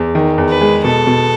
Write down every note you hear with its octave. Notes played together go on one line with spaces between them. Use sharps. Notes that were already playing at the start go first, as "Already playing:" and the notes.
Already playing: E2
D#3
E2
B4
G#3
B2 A4
B2